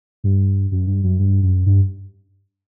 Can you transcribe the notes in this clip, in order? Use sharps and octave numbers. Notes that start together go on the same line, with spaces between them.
G2
F#2
G2
F#2
G2
F#2
G2